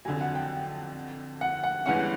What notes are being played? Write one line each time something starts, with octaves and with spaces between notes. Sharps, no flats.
F2 D3 F#3 G#5
F#5
G5
F#5
F#5
G1 G2 E3 G#3 C#4 F#5